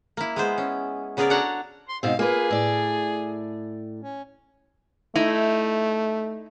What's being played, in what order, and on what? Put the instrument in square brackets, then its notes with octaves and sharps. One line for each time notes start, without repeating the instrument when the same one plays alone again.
[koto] A#3 E4
G#3 B3 C5
C#4
C#3 B3 G#4 A#4 D5
D4 F#4 A4 C#5 F#5 A#5
[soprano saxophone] C6
[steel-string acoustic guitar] G#2 B2 C4 [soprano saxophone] F5
[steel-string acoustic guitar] A#3 F4 B4 [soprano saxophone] G#4
[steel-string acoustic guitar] A2 D5
[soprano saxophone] C#4
[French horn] A3 [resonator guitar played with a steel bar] D#4 E4